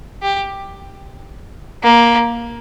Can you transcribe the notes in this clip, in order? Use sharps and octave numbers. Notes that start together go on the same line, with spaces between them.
G4
A#3